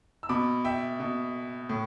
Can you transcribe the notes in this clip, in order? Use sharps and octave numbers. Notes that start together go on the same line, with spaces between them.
E6
B2 B5 D6
E5 G5
B2
A2